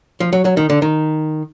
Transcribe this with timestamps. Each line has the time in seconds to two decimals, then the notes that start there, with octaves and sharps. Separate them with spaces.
0.20 F3
0.33 F#3
0.45 F#3
0.57 D#3
0.70 D3
0.82 D#3